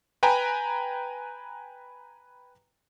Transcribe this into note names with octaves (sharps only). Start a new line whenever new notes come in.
B4 G5 G#5 A#5 B5